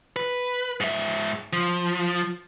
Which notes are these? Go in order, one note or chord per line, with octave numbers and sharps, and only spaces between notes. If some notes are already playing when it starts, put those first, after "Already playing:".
B4
G#2 E5
F3